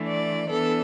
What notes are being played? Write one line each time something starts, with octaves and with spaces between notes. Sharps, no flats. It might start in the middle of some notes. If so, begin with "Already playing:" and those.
Already playing: E3 A3 D4
D5
E3 B3 D4 A4